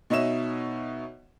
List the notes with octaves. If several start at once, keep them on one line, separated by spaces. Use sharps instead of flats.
B2 D#4 C#5 D#5 E5 E7